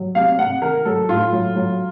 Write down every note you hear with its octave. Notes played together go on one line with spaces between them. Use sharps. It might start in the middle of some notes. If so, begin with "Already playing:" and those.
Already playing: F#3
C3 F5
C3 F#5
D#3 A#4
F#3 A4
A2 F4
F#3
F#3